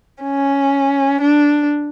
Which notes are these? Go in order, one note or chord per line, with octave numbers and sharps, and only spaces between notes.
C#4
D4